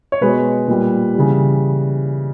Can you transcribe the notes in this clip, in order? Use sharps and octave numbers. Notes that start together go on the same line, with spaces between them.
C#5
B2 G#3 B4
A#2 G3
C#3 E3 G3